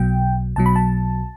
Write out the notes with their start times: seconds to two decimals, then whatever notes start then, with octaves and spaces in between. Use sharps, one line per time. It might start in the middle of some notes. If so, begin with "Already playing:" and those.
Already playing: B1 B2 F#3 G5
0.56 B1 B2 F#3 A5
0.66 B5
0.76 A5